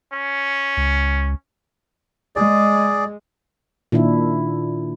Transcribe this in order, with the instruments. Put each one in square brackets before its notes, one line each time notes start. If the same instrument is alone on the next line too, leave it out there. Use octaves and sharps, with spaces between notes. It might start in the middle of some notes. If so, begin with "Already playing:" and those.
[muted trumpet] C#4
[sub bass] C#2
[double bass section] G#3 [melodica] G#4 D5
[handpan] A#2 D#3 D4 E4